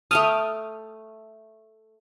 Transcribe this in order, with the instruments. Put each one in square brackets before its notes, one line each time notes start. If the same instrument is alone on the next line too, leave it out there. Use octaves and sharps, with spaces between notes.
[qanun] A3 G5 A5 [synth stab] D#6 F6